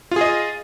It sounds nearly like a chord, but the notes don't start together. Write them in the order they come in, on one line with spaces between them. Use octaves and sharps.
F4 G#4 D#5